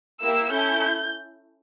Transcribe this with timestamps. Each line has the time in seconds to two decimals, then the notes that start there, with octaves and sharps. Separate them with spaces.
0.23 A#3 E4 G4 E6
0.52 C#4 E4 A4 G6